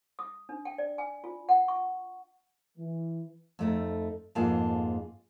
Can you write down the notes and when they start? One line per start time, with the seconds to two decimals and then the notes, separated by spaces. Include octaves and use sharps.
0.19 D#6
0.49 D4
0.65 G5
0.78 D5
0.98 G#5
1.24 F4
1.49 F#5
1.68 C#6
2.78 E3
3.59 F2 A3 D#4
4.35 F2 G#2 A#3 F4 G#4 A5